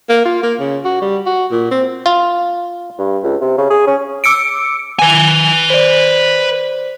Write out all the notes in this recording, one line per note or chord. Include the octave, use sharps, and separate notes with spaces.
A#3
F4
A#3
C#3
F#4
G3
F#4
A#2
C4
F4
G2
C#2
C3
C#3
G#4
C#4
D6 E6 C#7 D7
B4 G#5
C5 D5